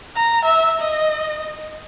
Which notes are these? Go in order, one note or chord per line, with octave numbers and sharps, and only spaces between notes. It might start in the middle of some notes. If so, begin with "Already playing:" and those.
A#5
E5
D#5